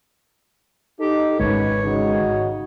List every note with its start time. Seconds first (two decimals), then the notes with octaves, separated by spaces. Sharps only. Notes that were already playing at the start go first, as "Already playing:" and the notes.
1.00 D#4 G4 A4
1.40 G#1 F#2 B2 G#3 B4 C#5
1.84 C#3 D#4 F#4